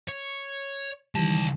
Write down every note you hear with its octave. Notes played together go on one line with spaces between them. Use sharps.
C#5
C#2 D#3 E3 G3 A5